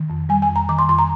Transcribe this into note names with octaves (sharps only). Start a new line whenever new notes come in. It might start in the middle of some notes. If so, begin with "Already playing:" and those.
Already playing: D#3
F2
G3 G#5
G#5
F2
A#5
D#3 D6
C6
F2 C6
A#5